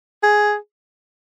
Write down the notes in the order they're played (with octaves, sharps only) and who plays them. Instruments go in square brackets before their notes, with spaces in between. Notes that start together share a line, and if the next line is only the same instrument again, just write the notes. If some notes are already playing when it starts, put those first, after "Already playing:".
[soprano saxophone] G#4